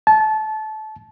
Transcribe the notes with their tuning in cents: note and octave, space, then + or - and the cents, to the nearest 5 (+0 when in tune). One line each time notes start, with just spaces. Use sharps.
A5 -25